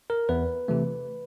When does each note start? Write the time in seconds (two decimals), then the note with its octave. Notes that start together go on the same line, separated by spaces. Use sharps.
0.10 A#4
0.29 E2 B4
0.68 C3 E3 A3